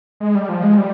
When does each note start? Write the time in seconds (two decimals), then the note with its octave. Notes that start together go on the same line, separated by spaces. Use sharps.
0.20 G#3
0.35 G3
0.49 F3
0.63 G#3
0.78 G3